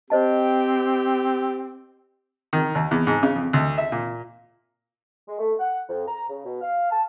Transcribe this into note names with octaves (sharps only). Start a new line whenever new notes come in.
C4 G4 C5 D#5 A5
D#3
D#2
E2
G#2
C#3
F2
D2
E5
A#2
G#3
A3
F#5
F2
A#5
C#3
B2
F5
A5